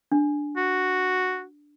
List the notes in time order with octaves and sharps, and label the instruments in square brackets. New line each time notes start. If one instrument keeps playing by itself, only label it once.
[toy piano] D4
[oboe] F#4